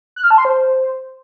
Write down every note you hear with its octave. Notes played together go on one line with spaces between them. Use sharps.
F#6
F6
A5
C6
C5